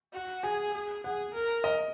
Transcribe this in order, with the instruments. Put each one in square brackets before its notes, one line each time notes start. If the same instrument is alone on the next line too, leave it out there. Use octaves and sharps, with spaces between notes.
[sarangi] F#4
[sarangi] G#4 [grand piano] G#5
[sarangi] G#4
[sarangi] G#4 [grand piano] F#5
[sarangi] A#4
[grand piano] D#5